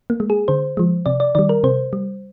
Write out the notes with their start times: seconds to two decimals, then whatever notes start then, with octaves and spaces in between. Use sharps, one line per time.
0.10 A#3
0.20 G#3
0.30 G#4
0.48 D3 C5
0.77 F3 G#3
1.06 C3 D5
1.20 D5
1.35 D#3 G3 D5
1.49 A#4
1.64 C3 C5
1.93 G3